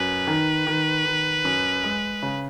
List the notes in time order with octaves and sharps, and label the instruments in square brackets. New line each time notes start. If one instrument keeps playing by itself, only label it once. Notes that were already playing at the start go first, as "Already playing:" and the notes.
Already playing: [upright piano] F#2 [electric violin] B4
[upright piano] D#3
D#3
D#3
F#2
G#3
C#3